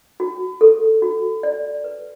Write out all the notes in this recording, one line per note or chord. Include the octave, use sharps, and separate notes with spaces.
F#4
A4
F#4
D5
B4